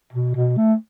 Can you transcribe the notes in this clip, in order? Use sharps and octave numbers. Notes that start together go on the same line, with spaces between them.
B2
B2
A3